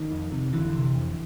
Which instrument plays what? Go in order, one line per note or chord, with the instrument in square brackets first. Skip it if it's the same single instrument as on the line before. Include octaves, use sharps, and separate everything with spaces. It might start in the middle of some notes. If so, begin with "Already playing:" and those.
Already playing: [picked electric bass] D#3
F2
C3
F2 D3 E3
C3
F2